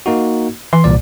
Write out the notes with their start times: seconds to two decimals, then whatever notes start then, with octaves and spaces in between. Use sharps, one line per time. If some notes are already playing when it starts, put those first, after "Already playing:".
0.06 A#3 D#4 F#4
0.73 E3 C6
0.84 C2 A#2 D5